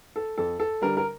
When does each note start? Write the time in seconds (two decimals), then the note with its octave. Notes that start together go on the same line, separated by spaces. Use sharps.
0.16 A4
0.38 F2 A4
0.60 A4
0.81 D3 G3 A#4
0.97 A#4